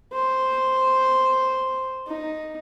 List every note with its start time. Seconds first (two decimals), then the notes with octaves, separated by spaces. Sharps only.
0.13 C5
2.07 D#4